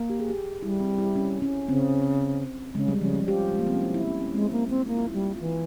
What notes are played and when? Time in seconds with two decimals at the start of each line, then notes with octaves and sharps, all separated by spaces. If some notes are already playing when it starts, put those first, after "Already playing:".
Already playing: A#3
0.10 G4
0.20 G#4
0.30 G4
0.63 G3 E4
0.80 C4
0.98 E4
1.16 C#4
1.42 C#4
1.68 C#3 C4
2.75 C#3 G#3
2.88 G3
3.01 C#3 F3
3.15 C#4
3.28 F3 G4
3.52 G#3
3.59 A#3
3.67 C4
3.74 C#4
3.81 E4
3.94 E4
4.08 C#4
4.21 C#4
4.34 G#3 C4
4.52 G#3 A#3
4.70 A#3 C4
4.88 A#3 E4
4.97 F4
5.07 E4
5.14 G3 F4
5.26 E4
5.36 E3 F4
5.46 E4